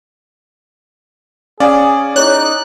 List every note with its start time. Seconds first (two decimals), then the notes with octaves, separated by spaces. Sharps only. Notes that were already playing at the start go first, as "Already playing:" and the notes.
1.60 C#4 G#4 D5 F5 G#5
2.16 D#4 E4 G#4 C#5 F#6